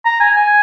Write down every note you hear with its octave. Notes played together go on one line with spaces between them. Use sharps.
A#5
G#5
G#5